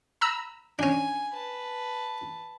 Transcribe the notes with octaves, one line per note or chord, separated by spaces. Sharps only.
A#5 B5 E6
C#4 D4 G#5
B4 A5